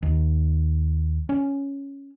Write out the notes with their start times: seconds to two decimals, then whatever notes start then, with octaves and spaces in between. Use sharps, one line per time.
0.03 D#2
1.29 C#4